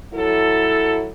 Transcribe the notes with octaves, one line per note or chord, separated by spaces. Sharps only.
F#3 E4 A4